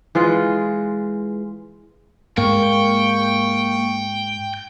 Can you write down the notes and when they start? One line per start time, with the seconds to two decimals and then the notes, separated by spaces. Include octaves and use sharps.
0.15 E3 G#3 F4
2.38 G#2 A#3 G5 C#6